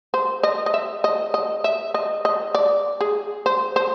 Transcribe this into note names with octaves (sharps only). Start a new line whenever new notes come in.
C5
D#5
D#5
E5
D#5
D#5
E5
D#5
D#5
D5
G#4
C5
C5